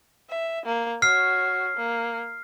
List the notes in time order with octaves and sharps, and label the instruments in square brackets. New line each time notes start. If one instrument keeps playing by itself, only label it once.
[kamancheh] E5
A#3
[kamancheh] F#4 C#5 [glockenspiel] F6 C7
[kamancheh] A#3